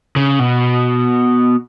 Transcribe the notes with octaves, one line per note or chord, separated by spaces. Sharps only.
C#3
B2